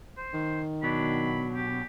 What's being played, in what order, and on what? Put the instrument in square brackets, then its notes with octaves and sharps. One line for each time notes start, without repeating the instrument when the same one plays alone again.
[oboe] C5
[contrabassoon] D#3
[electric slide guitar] B2 F#3 D4 [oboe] B5
[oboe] G4